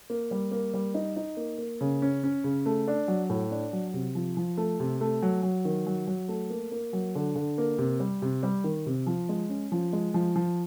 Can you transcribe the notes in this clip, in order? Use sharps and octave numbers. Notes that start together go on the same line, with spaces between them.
A#3
G3
A#3
G3
D#4
D#4
A#3
A#3
C#3
C#4
C#4
C#3
A3
D4
F#3
A2
D4
F#3
C3
F3
F3
A3
C3
A3
F#3
F#3
D#3
F#3
F#3
A3
A#3
A#3
F#3
D3
D3
A#3
C3
G3
C3
G3
D#3
C3
F3
G#3
C#4
F3
G#3
F3
F3